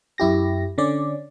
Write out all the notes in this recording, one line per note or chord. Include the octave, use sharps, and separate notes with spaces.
F#2 E4 G4 A#6
D3 C#4 D5